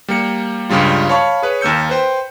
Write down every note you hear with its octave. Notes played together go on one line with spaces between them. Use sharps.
G3 A#3 C#7
C#2 G2 C#3 G3 F4
C#5 F5 A5 B5 C#6
G#4 B4 C#5
D#2 A#3 E6 G6 C#7
B4 C5 G5